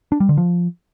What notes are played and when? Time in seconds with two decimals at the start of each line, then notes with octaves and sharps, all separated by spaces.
0.12 D4
0.20 G3
0.29 D3
0.37 F3